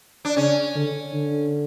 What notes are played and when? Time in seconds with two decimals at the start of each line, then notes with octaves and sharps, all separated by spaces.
0.25 D4
0.37 C#3 C#4
0.75 D3
1.14 D3